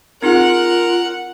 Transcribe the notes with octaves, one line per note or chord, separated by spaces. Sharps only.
C4 D#4 F4 G#4 A#4 F#5